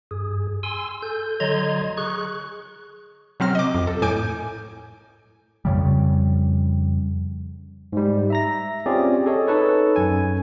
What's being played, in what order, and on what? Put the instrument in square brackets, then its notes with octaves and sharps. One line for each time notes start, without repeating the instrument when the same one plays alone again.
[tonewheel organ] G2 G#4
G#5 C6 E6
A4 G6
D3 F#3 D#5 A#5 C6 G#6
G#4 C#6 F#6
[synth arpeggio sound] C3 F#3 C4 F6 A#6
D#5 D6
F2
A4
A2 G#5 D6 G6 D7
[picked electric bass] F2 C#3 G3
[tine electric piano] G#2 G3
E5 A#5 A#6
C4 C#4 F4 G4 G#4 D5
G#4 A4 C#5 D#5
D#4 A4 B4 C#5
F#2 G#5